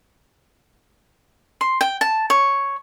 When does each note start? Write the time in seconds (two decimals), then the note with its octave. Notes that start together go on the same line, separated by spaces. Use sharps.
1.61 C6
1.81 G5
2.01 A5
2.30 C#5